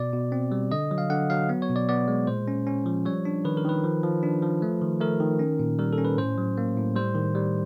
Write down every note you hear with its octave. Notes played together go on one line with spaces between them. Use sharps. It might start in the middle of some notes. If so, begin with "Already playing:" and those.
Already playing: B2 D5
B2
C4
G3
D3 D#5
F#3
F5
D3 F#5
F#3 F5
B3
C#5
B2
D5
B3 D5
G#3
A#2 C5
C#4
C#4
F3
G3 C#5
D4
D#3 B4
A#4
D#3 B4
F3
F3
D4
F3
A3
D#3
A3 A#4
D#3
C#4
A#2
G3 A#4
A4
C#4
B4
A2 C5
F#3
A#3
A2
G3 C5
D#3
G3